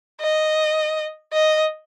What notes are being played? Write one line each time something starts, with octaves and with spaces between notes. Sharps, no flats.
D#5
D#5